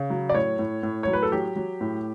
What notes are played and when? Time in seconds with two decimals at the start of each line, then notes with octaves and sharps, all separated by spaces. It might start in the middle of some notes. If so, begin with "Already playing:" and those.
Already playing: C#3
0.10 F#3
0.29 D5
0.34 A2 C#5
0.59 A2
0.83 A2
1.03 F#3 C#5
1.13 B4
1.23 A4
1.32 F#3 G4
1.56 F#3
1.81 A2